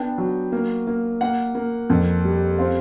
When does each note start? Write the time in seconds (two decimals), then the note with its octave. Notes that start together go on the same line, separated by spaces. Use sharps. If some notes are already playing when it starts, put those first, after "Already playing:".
Already playing: B3 D4 G5
0.18 F#3
0.52 A#3
0.87 A#3
1.21 A#3 F#5
1.55 A#3
1.90 F2
2.25 G3
2.59 C4 F5